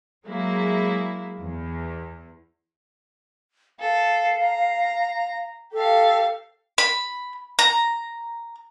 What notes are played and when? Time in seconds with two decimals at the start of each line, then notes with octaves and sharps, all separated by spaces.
0.25 F#3 G#3 A#3 E4
1.40 E2
3.80 A4 F5
4.42 A#5
5.73 G4 A4 F5
6.78 B5
7.59 A#5